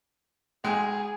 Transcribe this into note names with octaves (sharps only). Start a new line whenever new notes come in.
B1 G#3 G#4 G5